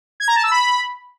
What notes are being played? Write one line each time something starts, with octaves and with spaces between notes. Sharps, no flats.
G#6
A#5
A5
E6
B5